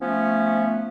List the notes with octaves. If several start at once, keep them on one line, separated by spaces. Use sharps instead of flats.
F3 A3 B3 C#4